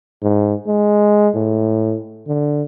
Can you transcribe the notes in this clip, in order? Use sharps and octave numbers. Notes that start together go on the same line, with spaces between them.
G#2
G#3
A2
D3